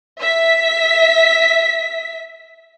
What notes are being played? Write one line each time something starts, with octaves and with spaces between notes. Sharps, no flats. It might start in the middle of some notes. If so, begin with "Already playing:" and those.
E5 B6